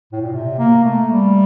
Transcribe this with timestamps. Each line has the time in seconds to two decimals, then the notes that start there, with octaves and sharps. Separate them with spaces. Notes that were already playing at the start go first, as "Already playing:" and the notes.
0.12 A2
0.22 A#2
0.32 C3
0.59 A#3
0.84 A3
1.11 G3